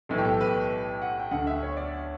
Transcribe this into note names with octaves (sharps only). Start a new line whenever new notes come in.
B1 A2 E3 A4
G4
A4
B4
F#5
G5
D2 D3 F#5
E5
C#5
D5